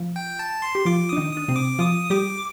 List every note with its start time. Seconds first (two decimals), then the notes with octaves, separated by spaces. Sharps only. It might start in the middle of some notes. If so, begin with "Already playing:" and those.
Already playing: F3 F4
0.16 G5
0.39 A5
0.62 C6
0.75 G4
0.85 F3 F4 D6
1.09 D4 D#6
1.17 D#3 D#4
1.33 D4 D#6
1.48 C3 C4
1.56 D6
1.79 F3 F4 D#6
2.10 G3 G4 D6